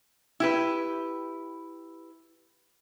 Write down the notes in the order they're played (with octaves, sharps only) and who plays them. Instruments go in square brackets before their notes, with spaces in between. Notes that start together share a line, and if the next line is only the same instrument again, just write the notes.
[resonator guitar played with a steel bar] E4 G4 B4